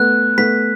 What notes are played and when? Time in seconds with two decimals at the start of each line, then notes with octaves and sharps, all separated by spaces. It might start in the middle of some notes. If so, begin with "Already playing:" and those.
Already playing: A3 B3 F#6
0.38 A3 B3 B6